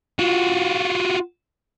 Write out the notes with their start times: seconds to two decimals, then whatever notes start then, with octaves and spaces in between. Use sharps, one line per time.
0.19 F4 F#4